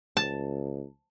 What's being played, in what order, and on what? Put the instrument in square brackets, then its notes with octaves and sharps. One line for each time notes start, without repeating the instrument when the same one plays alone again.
[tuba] C#2 [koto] A5